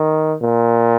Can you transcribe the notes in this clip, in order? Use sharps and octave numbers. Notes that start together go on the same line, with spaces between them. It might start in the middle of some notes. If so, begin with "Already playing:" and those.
Already playing: D#3
A#2